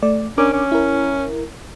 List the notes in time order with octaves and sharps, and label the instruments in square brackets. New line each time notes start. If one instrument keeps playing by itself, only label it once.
[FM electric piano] A3 D5
[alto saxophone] C#4 [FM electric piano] D4 A#4 D6
[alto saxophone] C#4
[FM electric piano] E4 A#4